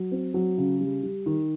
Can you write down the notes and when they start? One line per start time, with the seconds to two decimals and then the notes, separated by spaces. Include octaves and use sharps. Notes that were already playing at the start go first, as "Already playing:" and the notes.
Already playing: F#3
0.12 C4
0.34 F#3
0.58 C#3
0.81 G3
1.03 G3
1.26 D#3